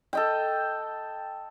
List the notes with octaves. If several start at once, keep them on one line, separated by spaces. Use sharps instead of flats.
A4 D#5 G5